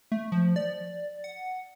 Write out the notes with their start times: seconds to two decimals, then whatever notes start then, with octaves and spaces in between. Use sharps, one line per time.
0.12 A3
0.32 F3
0.56 D5
1.24 F#5